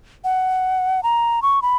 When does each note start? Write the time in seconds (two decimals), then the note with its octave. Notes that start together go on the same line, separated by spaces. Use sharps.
0.24 F#5
1.03 A#5
1.42 C#6
1.62 B5